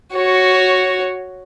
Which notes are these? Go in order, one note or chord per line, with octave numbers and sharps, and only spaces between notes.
F#4 C#5